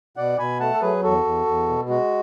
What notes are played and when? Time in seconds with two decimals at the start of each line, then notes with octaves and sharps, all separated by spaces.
0.17 B2 D5 F#5
0.39 B2 G#5 B5
0.60 A3 F#5 A5
0.74 A4
0.82 F#3 G#4 B4
1.03 E2 F#4 A4
1.24 E2
1.46 E2
1.68 B2
1.89 G#3 F#4